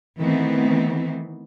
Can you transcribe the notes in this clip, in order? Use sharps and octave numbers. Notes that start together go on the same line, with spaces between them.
D#3 E3 A3 B3 C4